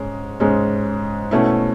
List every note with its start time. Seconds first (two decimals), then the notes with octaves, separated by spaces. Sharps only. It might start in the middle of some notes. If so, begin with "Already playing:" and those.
Already playing: G#2 G#3 C#4
0.40 G#2 G#3 C#4
1.31 B2 A3 C#4 E4